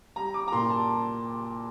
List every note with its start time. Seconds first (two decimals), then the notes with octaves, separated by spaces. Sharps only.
0.16 G3 A#5
0.34 D6
0.48 A#5
0.52 A#2 C6
0.70 A5